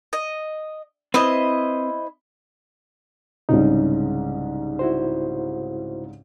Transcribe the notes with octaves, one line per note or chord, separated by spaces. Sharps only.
D#5
C4 E4 B4 C5 D#5
C2 G#2 C#3 D#4
E4 F#4 C5